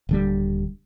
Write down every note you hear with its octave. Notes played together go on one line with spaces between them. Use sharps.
D#1 D3 G3